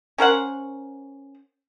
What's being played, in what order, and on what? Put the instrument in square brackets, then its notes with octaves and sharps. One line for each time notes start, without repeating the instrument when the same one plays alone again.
[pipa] C#4 A#4 C5 F#5